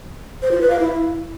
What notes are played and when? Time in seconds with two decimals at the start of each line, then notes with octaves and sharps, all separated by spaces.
0.42 C5
0.51 F4
0.61 B4
0.70 F5
0.79 E4